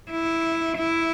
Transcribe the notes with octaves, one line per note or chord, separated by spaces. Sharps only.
E4
E4